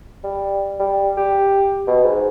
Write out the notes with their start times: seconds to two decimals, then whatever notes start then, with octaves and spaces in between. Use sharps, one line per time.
0.24 G3
0.79 G3
1.17 G4
1.87 B2
2.04 G#2